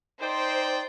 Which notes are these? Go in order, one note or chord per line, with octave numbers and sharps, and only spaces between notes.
D#4 C5 D5 G5